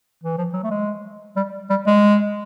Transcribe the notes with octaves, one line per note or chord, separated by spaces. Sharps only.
E3
F3
F#3
A3
G#3
G3
G3
G#3